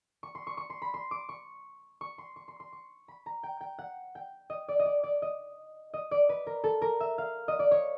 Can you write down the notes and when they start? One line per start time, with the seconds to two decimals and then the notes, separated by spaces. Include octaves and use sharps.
0.23 C#6
0.35 C6
0.47 C#6
0.57 C#6
0.70 C6
0.82 B5
0.94 C6
1.11 D6
1.29 C#6
2.01 C#6
2.18 C6
2.36 C#6
2.48 C6
2.60 C6
2.73 C#6
3.08 B5
3.26 A#5
3.43 G5
3.61 G5
3.79 F#5
4.15 G5
4.50 D#5
4.69 D5
4.79 D#5
4.85 D5
5.04 D5
5.22 D#5
5.94 D#5
6.11 D5
6.29 B4
6.47 A#4
6.64 A4
6.82 A#4
7.00 E5
7.18 F5
7.48 D#5
7.59 D5
7.71 C#5